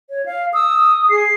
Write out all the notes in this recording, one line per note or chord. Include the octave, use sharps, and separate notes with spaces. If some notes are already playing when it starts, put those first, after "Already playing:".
C#5
F5
D#6 E6
G#4 C7